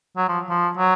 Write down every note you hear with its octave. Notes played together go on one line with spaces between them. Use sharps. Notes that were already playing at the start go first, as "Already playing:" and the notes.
F#3
F3
F3
F#3